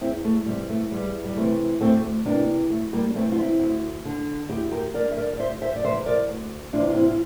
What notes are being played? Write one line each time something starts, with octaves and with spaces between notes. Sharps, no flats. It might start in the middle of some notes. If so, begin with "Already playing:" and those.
E2 C4 E4
A3
C3 E3 G3
A3
E2 G3
G3
C3 E3 A3
D2 A3 C4
C3 E3 A#3 D4
D2 A3
G3 A#3
D4
C3 E3 A3 C4
F4
C4 E4
D2
D3
D2 E4 G4
G4 A#4
D3 A#4 D5
E5
A#4 D5
D5
D2 C5 E5
C5 E5
D5
C3 E3 C5 E5
A#4 D5
D2
C3 E3 D4 F4
F4
C4 E4
F4